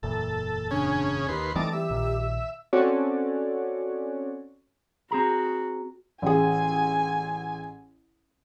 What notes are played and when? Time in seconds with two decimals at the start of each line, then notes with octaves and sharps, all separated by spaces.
0.03 F#1 E2 A#2 A4
0.71 C#3 C#4 D4 G#4
1.28 D#2 G4 B4 C6
1.56 E3 G3 A3 C4 D#4 A5 D6
1.73 G4 E5
1.90 A#1 A#2 D#3
2.73 C4 C#4 F#4 A4 C#5 D5
5.11 C4 F#4 G#4 A#5
6.22 A1 G#4 G#5